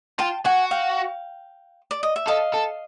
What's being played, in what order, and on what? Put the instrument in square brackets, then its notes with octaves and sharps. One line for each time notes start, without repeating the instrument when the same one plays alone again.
[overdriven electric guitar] F4 [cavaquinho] G5 A5
[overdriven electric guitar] F#4 [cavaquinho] F#5 G#5
[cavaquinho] F5 G5
D5
D#5
E5
[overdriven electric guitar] A4 [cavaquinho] D#5 F5
[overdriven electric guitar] A4